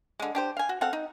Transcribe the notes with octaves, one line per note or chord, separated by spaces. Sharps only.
D3 G#3
D4 G4 C5
F5 G#5
F#4
C4 A4 F5 F#5
D#4